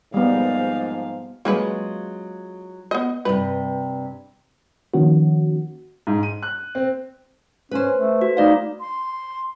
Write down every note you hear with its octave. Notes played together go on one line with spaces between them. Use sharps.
G#2 F3 G3 A#3 B3 F5
F#3 G#3 A#3 C#4 F4 B4
B3 D#5
G2 C3 B4
D#3 F3 A#3 C#4 F#4
G#2
D#7
F#6
C4
C#4 B4 C5
A3
F#4
A3 D#4 D5 F5
C6